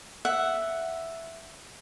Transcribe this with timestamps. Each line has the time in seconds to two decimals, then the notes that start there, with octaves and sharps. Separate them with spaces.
0.25 E5 F#5